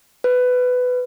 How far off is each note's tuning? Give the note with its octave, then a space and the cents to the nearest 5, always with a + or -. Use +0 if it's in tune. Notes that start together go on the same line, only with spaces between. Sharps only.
B4 +15